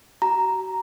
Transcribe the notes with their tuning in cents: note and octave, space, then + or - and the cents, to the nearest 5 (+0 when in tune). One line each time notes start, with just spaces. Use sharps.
F#4 +40 A#5 +0